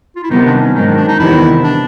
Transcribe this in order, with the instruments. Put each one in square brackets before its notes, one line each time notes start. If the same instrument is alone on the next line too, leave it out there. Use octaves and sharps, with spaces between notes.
[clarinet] F4
E4
[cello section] C3 D#3 G3 B3 [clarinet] D#4
[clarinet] D4
C#4
[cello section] G#2 D#3 F#3 [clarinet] D#4
[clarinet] D4
D4
D#4
[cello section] E2 C3 D#3 G3 B3 [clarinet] E4
[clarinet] D4